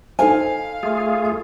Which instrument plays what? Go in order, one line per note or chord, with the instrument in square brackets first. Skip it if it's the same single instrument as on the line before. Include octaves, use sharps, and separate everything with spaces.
[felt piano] D#4 A4 C5 [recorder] F5 [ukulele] G#5
[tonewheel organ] A3 F4 G#4